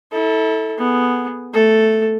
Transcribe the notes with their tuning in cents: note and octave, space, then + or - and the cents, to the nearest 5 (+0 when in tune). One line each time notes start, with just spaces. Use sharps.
E4 -35 A4 +0
B3 +0 G#4 +0
A3 +0 A4 +0